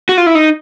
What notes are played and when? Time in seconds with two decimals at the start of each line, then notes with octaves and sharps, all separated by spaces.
0.09 F#4
0.18 F4
0.26 E4
0.35 D#4